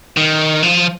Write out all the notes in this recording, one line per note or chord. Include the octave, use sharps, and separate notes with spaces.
D#3
F3